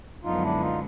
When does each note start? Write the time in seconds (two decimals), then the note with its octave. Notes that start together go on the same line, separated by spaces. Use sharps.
0.24 F#2 D3 F3 G#3 B3 D#4 F4
0.42 D4 E4
0.60 D#4 F4